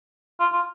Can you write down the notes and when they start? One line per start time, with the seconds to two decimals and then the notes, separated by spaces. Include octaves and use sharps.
0.40 F4
0.53 F4